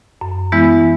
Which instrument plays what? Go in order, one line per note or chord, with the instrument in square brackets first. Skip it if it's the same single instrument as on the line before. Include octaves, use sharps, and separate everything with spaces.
[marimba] F#2
E3 G#3 B3 E4